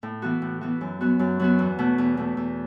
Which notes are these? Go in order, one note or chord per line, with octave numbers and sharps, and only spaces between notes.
A2
E3 B3 F#4
A2
E3 B3 F#4
F#2
F#3 B3 F#4
F#2
F#3 B3 F#4
E2
B2 A3
E2
B2 A3
E2